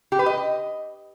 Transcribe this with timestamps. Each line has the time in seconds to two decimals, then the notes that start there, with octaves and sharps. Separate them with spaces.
0.12 G4
0.19 B4
0.26 D#5